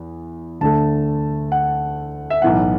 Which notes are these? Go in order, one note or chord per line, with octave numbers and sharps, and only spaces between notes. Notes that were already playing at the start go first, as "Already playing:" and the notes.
Already playing: E2
D2 D3 A3 A5
F#5
E5
B1 A2 E3 B3 F#5